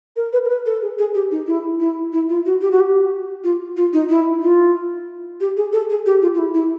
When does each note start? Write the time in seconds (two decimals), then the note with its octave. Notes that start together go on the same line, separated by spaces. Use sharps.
0.16 A#4
0.33 B4
0.45 A#4
0.49 B4
0.66 A4
0.82 G#4
0.99 G#4
1.15 G4
1.31 D#4
1.47 E4
1.80 E4
2.13 E4
2.29 F4
2.46 F#4
2.61 G4
2.71 F#4
2.80 G4
3.44 F4
3.77 F4
3.93 D#4
4.09 E4
4.42 F4
5.40 G4
5.57 G#4
5.73 A4
5.90 G#4
6.06 G4
6.22 F4
6.34 F4
6.38 E4
6.54 E4